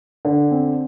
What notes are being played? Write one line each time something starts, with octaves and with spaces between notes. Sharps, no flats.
D3
C4